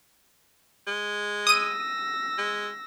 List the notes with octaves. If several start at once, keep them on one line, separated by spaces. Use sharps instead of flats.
G#3
D#6 E6 A#6 D#7
G#3